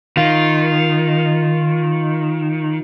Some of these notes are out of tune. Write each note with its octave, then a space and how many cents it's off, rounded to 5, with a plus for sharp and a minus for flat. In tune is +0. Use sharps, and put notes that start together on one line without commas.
D#3 +0 F4 +0